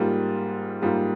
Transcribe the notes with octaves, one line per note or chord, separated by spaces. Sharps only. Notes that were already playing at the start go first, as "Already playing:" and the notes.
Already playing: G#2 G3 A#3 F4
G#2 G3 A#3 F4